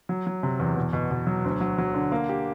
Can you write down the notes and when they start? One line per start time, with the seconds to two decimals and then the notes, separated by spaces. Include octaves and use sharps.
0.09 F#3
0.27 F#3
0.43 C3
0.60 E2
0.76 B2
0.93 B2
1.11 B2
1.27 F#3
1.44 D2
1.61 F#3
1.78 F#3
1.94 D3
2.12 A#3
2.29 G4